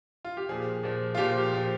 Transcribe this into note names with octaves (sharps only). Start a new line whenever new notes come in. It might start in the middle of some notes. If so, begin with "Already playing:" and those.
F4
G4
A#2 F3 G#4
A#2 F3
F4
A#2 F3 G4
A#2 F3